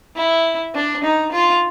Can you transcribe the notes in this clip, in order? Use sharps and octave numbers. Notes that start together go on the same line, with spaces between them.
E4
D4
D#4
F4